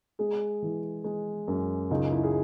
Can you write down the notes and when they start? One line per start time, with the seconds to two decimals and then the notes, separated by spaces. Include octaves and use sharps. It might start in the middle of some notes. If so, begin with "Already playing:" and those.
0.19 G#3 G#4
0.62 E3
1.04 G#3
1.48 F#2
1.91 C#2 D#4
2.12 E4
2.24 G#4